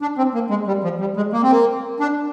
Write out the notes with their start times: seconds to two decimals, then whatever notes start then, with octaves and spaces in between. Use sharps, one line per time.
0.02 D4
0.18 C4
0.34 A#3
0.50 G#3
0.67 G3
0.84 F3
1.00 G3
1.16 G#3
1.33 A#3
1.43 C4
1.51 A#3
2.00 D4